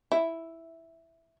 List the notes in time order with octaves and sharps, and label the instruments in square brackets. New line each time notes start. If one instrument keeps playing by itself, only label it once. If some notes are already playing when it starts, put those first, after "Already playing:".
[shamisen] E4